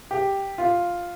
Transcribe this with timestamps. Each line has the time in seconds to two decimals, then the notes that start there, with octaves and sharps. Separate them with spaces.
0.11 G4
0.58 F4